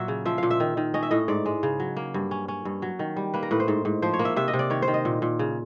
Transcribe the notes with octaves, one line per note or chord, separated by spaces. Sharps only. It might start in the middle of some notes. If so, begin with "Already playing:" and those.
Already playing: A#2 F#3 A#3 E5 F#5
C#3
F3 E5
A#2 F5
E5
D#3
D#3
C#4 D#5
E5
A2 D#5
G#2 D5
G#3
C#3
F#3
A#3
G2
C#4
C#4
G2
F#3
D#3
G3
A#3 B4
A#4
A2 B4
C5
G#2
G#2
F3 C5
C#5
A#3
E5
C3 E5
D#5
C3
D5
D#3 C#5
C5
D#3
D#5
A#2
A#2
C#3